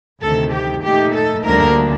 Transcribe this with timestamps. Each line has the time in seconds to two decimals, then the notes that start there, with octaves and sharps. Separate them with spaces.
0.22 D2 C3 D#3 A4
0.53 G4
0.84 A#2 A3 D#4 G4
1.14 A4
1.45 D2 D3 G3 A#3 D4 A#4